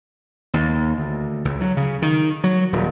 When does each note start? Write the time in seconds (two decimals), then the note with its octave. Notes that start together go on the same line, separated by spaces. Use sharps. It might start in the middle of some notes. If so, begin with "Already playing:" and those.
0.54 D#2
0.98 D2
1.45 C#2
1.61 F#3
1.77 C#3
2.02 D#3
2.44 F#3
2.73 D#1